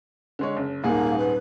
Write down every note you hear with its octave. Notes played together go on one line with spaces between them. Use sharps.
D3 G#3 C#5
F#1
D#1 G#2 A#3 G#4
B4